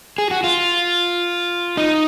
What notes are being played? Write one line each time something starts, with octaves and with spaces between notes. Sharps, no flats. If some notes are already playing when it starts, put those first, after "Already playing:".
G#4
F#4
F4
D#4